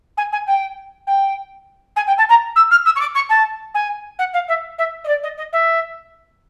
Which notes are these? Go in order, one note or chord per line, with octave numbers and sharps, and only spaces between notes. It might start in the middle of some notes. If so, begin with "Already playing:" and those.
G#5
G#5
G5
G5
G#5
G5
A5
A#5
E6
F6
E6
C#6
D6
C#6
A5
G#5
F#5
F5
E5
E5
D#5
D5
D#5
D#5
E5